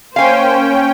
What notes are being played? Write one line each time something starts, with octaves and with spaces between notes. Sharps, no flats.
A#3 C#4 C5 F5 G5 G#5